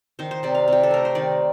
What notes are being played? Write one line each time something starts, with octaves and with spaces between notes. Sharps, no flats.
D#3 C5
C5
C3 D5
F5
C3 G4
A4
A3 A#4
C5
D#3 D5